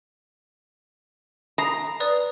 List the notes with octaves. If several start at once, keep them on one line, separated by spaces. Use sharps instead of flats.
A#5 D#6 A#6 C7
B4 D5 D#6